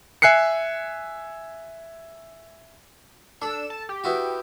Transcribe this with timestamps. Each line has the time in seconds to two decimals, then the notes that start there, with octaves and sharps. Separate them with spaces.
0.22 E5 G#5 F#6 C7 C#7
3.42 D4 A4 E6
3.70 A5
3.89 G4
4.04 B3 E4 F#4